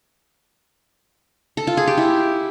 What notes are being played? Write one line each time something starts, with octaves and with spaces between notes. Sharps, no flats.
A4
F4
G#4
G4
E4